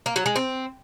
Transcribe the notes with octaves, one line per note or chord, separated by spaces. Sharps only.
A#3
F#3
G#3
C4